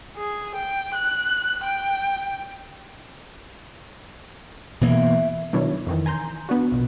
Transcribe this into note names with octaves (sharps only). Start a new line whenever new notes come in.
G#4
G5
F#6
G5
B2 E3 A#3 E4
B2 D#3 F#3 D4 E4 C#5
F2 D#3 E3
G#5 A#5 C6 G6
B3 D4 F#4
A#1 B2